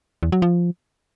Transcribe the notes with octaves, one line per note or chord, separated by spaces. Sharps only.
E2
F#3
F3